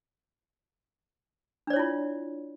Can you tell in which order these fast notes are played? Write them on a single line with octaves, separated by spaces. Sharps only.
D4 D5 C#5 E4 F4